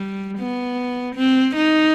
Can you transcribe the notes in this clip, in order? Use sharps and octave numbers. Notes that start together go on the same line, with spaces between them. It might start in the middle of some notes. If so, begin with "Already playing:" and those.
Already playing: G3
B3
C4
D#4